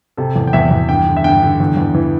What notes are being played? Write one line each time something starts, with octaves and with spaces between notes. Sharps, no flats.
C3 A4
E2
G5
E2 E5
E2
G2 G5
D3
E5
G2 G5
D3
E2
E2
E3